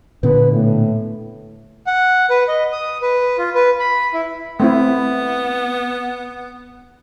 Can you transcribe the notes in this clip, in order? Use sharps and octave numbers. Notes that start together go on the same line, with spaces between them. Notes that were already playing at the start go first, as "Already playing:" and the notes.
A#2 D3 B3 B4
A2
F#5
B4
D#5
D#6
B4
F4
B4
B5
E4
A3 B3 C4 E4